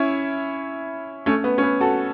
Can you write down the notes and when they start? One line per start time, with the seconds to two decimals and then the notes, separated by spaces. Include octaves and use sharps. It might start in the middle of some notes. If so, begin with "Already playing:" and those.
Already playing: C#4 E4
1.26 A3 C#4
1.44 B3
1.58 C#4
1.63 B3
1.81 F#4 A4